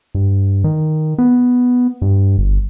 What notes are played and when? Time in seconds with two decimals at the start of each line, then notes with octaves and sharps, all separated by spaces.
0.15 G2
0.64 D#3
1.18 B3
2.02 G2
2.38 G1